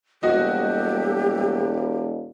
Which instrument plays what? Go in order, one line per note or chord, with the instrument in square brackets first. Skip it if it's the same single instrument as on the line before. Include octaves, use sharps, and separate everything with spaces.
[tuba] E1 [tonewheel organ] G3 A#3 A4 [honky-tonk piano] F#4 D#5 [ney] G4